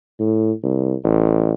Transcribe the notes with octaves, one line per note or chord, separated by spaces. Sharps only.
A2
C2
A1